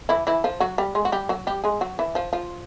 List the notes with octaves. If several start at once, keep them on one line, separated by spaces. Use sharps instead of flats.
E3 E4
E3 E4
F3 F4
F#3 F#4
G3 G4
G#3 G#4
F#4
G3 G4
F#3 F#4
G3 G4
G#3 G#4
F#3 F#4
E3 E4
F3 F4
F3 F4